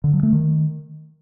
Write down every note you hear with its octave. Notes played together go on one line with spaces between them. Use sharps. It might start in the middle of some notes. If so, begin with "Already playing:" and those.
D3
F#3
A3
D#3